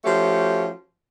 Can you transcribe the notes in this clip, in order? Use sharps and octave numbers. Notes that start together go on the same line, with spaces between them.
F3 A3 C#4 F#4 G4